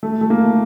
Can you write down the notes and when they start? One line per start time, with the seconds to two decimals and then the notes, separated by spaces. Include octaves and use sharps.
0.03 A3
0.21 A3
0.30 A#3